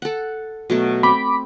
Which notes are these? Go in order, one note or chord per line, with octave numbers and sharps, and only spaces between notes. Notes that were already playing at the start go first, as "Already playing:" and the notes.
A4 F#5
B2 F#3 A3
C4 B5 D6